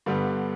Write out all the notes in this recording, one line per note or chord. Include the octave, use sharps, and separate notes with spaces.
G2 D3 G3 B3